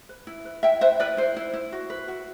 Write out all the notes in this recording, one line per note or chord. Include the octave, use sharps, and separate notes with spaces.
B4
E4
B4
E4 E5 G5
B4 C5 E5
E4 B4 D5
E4 C5
E4
E4
F#4
B4
F#4